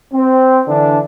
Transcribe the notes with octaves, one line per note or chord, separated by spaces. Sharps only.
C4
D3 E3 D4